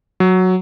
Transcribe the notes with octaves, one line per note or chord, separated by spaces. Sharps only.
F#3